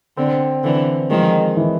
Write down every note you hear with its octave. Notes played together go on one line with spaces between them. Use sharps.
D3 C4
D3 E3 C4
D#3 F3 G#3
E3